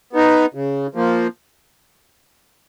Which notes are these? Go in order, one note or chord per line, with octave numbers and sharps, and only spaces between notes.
B3 D#4
C#3
F3 A#3